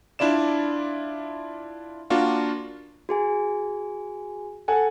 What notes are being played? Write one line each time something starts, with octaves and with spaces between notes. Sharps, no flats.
D4 E4 F4 D5 E7
A#3 D4 F4 F#4
F#4 G#4 G#5
A4 F#5 G#5